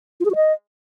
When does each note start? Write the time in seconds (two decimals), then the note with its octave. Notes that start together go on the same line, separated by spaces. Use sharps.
0.20 F4
0.25 G#4
0.30 F#4
0.35 D#5